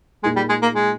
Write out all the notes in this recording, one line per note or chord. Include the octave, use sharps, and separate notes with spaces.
A#2 G#3 A#3 D#4 G#4
G3
G#3
A#3
G#3